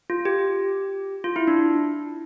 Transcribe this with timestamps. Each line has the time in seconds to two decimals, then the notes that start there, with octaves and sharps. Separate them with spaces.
0.10 F4
0.25 G4
1.24 F4
1.36 E4
1.47 D4